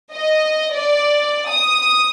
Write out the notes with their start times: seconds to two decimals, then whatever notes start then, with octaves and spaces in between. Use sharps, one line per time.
0.12 D#5
0.74 D5
1.50 D#6